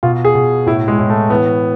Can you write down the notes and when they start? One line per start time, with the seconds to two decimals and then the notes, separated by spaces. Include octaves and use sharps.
0.03 B2 F4
0.25 G#4
0.35 B2
0.66 A2 E4
0.88 G#3
0.99 A2
1.10 A3
1.30 E3 B3